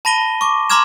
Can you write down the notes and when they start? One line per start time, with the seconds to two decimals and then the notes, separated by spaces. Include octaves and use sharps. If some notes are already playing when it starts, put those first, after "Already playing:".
0.05 A5 B5 A#6 D#7 G7
0.41 C#6 D6
0.70 A#5 C6 D6 F6 G#6 E7